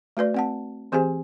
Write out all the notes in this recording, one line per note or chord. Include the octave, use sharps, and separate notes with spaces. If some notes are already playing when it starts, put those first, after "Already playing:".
A3 F#4 B4 D5
C4 F#5 A5
E3 C4 G4 G#4 C5 G#5